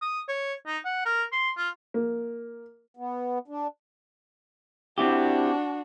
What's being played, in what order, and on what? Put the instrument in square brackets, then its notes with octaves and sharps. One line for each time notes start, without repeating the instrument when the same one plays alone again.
[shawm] D#6
C#5
D#4
F#5
A#4
C6
F4
[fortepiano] A#3
[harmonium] B3
D4
[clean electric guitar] C4 E4 G4 [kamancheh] D4 F#4